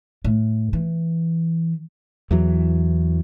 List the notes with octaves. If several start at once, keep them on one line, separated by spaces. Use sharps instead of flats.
A2
E3
E2 E3 F#3